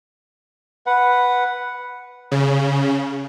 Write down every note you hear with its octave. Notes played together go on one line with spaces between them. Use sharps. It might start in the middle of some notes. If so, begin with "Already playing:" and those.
B4 F#5
C#3